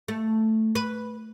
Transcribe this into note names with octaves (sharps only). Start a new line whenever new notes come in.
A3
B4